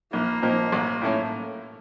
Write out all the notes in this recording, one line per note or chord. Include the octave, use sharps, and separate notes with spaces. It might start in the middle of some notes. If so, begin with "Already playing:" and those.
A#1 A#3
A#2 F3 C4 D#4
A1
A2 A3 C#4